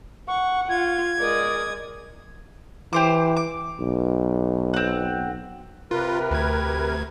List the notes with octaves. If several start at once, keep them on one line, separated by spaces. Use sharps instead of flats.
F#5 C#6
F4 G#6
G#3 A#4 D5 D#6
E3 G4 C5 D6
D6
B1
C4 F#5
C3 F4 A#4 B4
D2 G#6